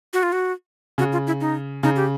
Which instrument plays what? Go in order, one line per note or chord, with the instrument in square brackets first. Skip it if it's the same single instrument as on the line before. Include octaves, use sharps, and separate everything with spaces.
[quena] F#4
F4
F#4
[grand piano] C#3 [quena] F#4
[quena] F4
E4
D#4
[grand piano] C#3 [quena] D#4
[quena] G4